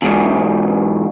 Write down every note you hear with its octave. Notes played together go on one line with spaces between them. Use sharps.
E2 G#2 B2